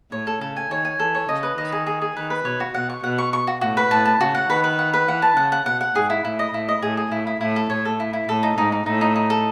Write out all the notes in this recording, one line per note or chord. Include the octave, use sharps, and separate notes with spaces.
A2 C#5
A4
C#3 A4
G#5
D#3 C#5
G#5
E3 A4
C#5
C#3 D#5
B4
D#3 D#5
G#4
G#4
G#4
D#3 B4
B4
B2 C#5
F#4
B2 F#5
C#6
B2 F#5
C#6
C#6
F#4
A2 F#4
B4
A2 A5
A5
C#3 F#4
F#5
D#3 B4
B4
F#5
B4
E3 F#5
A5
C#3 F#5
F#5
B2 F#5
F#5
G#2 G#4
E4
A2 E4
D#5
A2 E4
D#5
A2 G#4
G#4
A2 E4
E4
A2 E4
A4
A2 C#5
A4
E4
E4
A2 A4
D#4
G#2 D#4
D#4
A2 D#4
D#4
D#4
A4